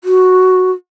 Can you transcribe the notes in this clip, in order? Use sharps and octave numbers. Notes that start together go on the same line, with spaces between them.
F#4